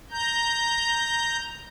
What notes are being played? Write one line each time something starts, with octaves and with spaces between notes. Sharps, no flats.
A#5 G6